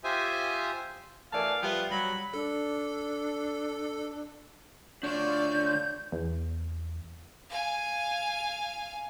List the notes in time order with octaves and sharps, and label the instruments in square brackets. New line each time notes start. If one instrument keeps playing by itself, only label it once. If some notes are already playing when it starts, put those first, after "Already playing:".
[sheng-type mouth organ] F4 G4 C5 E5 G#5 D#6
[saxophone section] E3 A3 D5 [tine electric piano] A#4 G#5 A5 [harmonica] F5
[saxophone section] F3 G3 [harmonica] B3 F4 [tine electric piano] E5 G5
[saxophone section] F#3 C#5 [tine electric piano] G3 A#6 [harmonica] B5
[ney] D4 [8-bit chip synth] A4
[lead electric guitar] D2 D4 [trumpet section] F4 C#5 [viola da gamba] D5 [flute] G6
[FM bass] E2
[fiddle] F5 G#5